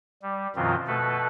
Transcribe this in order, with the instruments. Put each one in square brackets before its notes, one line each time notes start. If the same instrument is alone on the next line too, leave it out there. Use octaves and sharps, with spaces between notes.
[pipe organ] G3
F#2 B2 D#3 F3 C4 F4
B2 A3 A4 B4